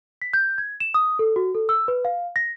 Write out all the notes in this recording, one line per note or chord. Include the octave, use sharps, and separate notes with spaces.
B6
G6
G#6
E7
D#6
A4
F#4
A4
E6
B4
F5
A#6